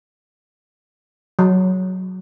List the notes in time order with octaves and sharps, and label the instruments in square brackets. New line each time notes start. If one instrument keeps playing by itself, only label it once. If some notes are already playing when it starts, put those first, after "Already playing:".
[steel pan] F#3